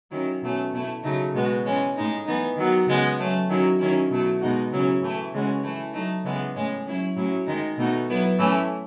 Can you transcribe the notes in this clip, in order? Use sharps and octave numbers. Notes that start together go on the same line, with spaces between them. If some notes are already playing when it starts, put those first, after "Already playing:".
D#3 F#3 C#4 E4
B2 F#3 A3 C#4
B2 A3 E4
C#3 F#3 A3 D#4
B2 G#3 B3 F#4
E3 G#3 C#4
A2 G#3 D#4
E3 B3 D#4
D#3 F#3 B3
C#3 G#3 B3
F#3 A3 C#4
D#3 F#3 C#4 E4
D#3 F#3 C#4 E4
B2 F#3 A3 E4
B2 G#3 D#4 F#4
C#3 F#3 C#4 E4
A2 E3 A3 E4
C#3 E3 G#3 C#4 F#4
E3 A3 E4
F#3 A3 D#4
C#3 E3 G#3 B3
A2 G#3 C#4
F#3 C#4 E4
A2 F#3 C#4 E4
D#3 G#3 D#4
B2 A3 D#4 F#4
F#3 B3 E4
A2 E3 A3 C#4